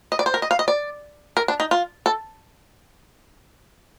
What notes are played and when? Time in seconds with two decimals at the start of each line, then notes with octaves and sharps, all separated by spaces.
0.12 D#5
0.19 D5
0.26 C5
0.34 A#4
0.42 D#5
0.51 F5
0.59 D#5
0.68 D5
1.37 A#4
1.48 D4
1.60 D#4
1.71 F4
2.06 A4